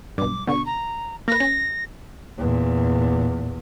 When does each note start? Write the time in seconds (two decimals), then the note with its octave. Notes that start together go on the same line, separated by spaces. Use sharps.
0.18 B1 G2 D6
0.47 B2 D3 C#6
0.66 A#5
1.28 A#3 B4 A#6
1.40 C#4
2.38 E2 A#2